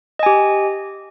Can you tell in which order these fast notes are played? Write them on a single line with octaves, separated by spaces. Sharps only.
D#5 G#5 G4